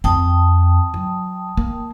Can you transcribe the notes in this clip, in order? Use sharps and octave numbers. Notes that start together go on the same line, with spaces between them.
F2 C4 G5 A5 D#6
F#3
A#3